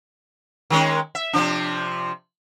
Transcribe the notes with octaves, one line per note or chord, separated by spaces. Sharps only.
D#3 G#3 C#4
E5
C3 F3 D4